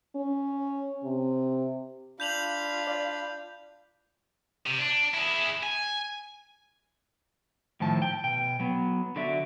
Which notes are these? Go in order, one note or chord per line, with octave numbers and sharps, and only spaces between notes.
C#4
C3
D4 F4 B5 G6 F7 F#7
D5
C3
D4
E4 G#4
G#5
A2 D#3 F3 A5
G5
B2 G5
F#3 B3
D3 F#3 F#4 D5 E5